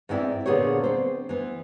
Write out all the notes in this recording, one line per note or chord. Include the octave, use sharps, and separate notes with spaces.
G#2 B3 C4 E4 D5 E5
A#2 D3 B3 G#4 C5 C#5
C4 C5
E3 B3